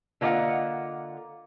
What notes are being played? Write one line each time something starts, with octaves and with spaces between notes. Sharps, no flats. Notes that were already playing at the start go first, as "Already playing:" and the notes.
D3 A#3 F4 D5 D#5 F#5